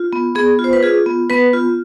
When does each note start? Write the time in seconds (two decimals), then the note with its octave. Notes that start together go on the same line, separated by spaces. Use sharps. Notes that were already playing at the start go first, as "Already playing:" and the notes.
Already playing: F4
0.13 B3
0.35 B3 G#4
0.59 F4
0.64 C5
0.73 B4
0.83 F4 G#4
1.06 B3
1.30 B3 B4
1.53 F4